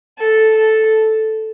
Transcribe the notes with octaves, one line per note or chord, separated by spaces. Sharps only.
A4
A4